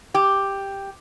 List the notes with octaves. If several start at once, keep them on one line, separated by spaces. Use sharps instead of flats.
G4